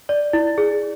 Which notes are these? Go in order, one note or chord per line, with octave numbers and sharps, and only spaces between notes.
D5
E4
G#4